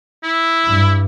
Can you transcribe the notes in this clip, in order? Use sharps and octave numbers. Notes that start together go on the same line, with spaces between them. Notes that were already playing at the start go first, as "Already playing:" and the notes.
E4
G2